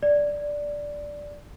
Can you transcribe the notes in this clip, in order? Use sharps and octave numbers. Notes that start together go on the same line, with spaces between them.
D5